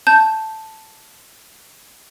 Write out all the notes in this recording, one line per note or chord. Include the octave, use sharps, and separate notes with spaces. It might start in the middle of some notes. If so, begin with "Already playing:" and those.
A5 G6